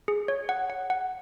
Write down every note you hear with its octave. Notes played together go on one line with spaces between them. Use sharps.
G#4
C#5
F#5
F#5
F#5